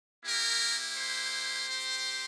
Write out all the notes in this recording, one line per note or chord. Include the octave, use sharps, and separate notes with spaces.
A#3 E4 G4 A#4
C5
C4 G4